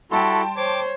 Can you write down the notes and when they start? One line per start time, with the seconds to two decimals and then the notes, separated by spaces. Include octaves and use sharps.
0.11 G3 E4 F#4 A4 G5 A5 C6
0.57 C5 C#5 D6